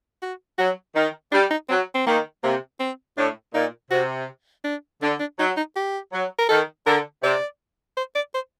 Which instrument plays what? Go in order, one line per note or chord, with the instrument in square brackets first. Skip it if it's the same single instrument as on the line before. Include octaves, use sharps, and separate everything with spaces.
[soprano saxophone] F#4
[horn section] F#3 [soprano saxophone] F#4
[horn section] D#3 [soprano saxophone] D#4
[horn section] G3 [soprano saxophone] D4
[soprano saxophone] D#4
[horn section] F#3 [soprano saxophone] C4
[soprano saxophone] C4
[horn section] D#3 [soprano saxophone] A#3
[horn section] C3 [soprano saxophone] A#3
[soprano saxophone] C4
[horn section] A2 [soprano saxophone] D4
[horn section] A#2 [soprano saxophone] D#4
[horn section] C3 [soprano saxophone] F#4
[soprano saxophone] D4
[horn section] D3 [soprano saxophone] D4
[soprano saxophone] D4
[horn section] F#3 [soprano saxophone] D#4
[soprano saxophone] D#4
G4
[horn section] F#3
[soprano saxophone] A#4
[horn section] D#3 [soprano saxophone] A4
[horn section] D3 [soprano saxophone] A#4
[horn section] C3 [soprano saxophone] D5
[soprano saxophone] C5
D5
C5